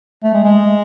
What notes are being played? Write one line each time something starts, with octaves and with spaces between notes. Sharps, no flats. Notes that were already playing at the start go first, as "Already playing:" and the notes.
A3
G#3
G#3